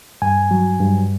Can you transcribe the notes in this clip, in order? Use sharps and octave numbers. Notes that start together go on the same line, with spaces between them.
G2 G#5
F#3
G2